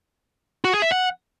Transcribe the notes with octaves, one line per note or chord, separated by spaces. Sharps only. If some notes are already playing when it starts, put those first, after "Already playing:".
F#4
G#4
E5
F#5